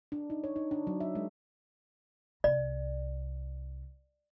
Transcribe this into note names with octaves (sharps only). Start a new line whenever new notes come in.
D4
D#4
C#5
D#4
D4
F#3
E5
G#3
C2 D5